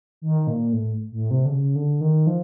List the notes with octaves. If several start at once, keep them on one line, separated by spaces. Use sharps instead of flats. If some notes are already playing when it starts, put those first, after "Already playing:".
D#3
A#2
A2
A2
C3
D3
C#3
D3
D#3
F3